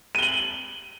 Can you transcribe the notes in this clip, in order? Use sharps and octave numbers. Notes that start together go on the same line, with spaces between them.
D#7 F#7 G7